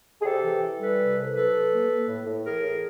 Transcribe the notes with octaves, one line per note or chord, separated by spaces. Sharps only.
G#4
C3 G4 A4
E3
E3
G3 A4 B4
C3
C2
F#3 A4 B4
F#3
A#3
A#3
A2
A2
E3 G#4 A#4
A2